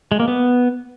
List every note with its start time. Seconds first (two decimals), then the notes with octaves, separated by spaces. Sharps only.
0.12 G#3
0.20 A#3
0.28 B3